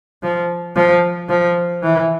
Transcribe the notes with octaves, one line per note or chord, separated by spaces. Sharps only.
F3
F3
F3
E3